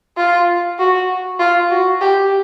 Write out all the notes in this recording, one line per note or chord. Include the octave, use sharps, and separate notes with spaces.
F4
F#4
F4
F#4
G4